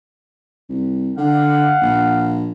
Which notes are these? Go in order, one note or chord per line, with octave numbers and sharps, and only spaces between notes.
C2
D3 F5 F#5
A#1